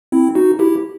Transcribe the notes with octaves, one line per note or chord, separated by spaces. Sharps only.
C4 E4
D#4 F#4
E4 G4